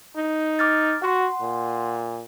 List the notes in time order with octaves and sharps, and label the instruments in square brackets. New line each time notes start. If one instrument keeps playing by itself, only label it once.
[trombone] D#4
[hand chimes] D6 F6 A6
[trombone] F#4 [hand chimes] F#5 C6
[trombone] A#2